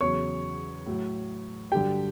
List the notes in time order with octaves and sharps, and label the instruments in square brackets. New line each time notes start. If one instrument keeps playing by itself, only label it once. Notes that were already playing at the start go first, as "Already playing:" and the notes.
[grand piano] E2 C#3 F#3 C#5 C#6
A2 F#3
G2 D3 F#3 G4 G5